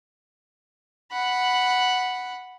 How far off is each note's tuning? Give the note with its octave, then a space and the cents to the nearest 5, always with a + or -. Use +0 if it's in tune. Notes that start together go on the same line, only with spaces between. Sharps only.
F#5 +0 B5 +0